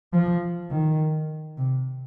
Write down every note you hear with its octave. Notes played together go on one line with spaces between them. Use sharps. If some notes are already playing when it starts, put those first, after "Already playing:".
F3
D#3
C3